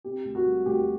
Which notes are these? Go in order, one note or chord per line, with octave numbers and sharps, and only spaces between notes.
C3 G4
D2
F#4
G3
D2 G4